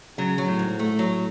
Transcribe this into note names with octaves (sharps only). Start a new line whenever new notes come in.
C#3 F#3
F#3
A2
G#2
A3
F#3